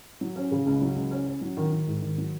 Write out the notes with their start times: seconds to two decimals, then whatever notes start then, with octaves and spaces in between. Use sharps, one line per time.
0.21 F#3
0.36 C#4
0.51 C#3
0.66 C#2
0.81 F#3
0.96 C#2
1.11 C#4
1.26 C#4
1.41 F#3
1.57 D#3
1.72 D#3
1.87 G#2
2.02 D#3
2.18 F#3